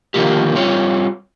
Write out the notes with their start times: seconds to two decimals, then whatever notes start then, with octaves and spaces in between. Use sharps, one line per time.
0.14 D3 D#3 F3 A#3 G4
0.55 G3 C4 F4 C#5